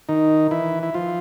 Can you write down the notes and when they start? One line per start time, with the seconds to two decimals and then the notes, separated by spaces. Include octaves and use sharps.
0.09 D#3 D#4
0.51 E3 E4
0.83 E4
0.94 F3 F4